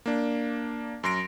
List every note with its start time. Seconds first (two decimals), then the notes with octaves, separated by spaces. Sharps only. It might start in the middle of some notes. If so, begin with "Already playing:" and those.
0.06 A#3 D4
1.04 F#2 C6 A#6 D7